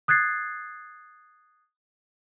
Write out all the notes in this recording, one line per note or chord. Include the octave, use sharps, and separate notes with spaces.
D#6 F#6 G#6 A6 C7